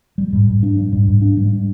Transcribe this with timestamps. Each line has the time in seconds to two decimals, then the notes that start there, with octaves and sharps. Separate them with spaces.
0.18 G3
0.33 G#2
0.47 G#2
0.63 D4
0.77 G3
0.92 G#2
1.07 G#2
1.22 D4
1.37 G3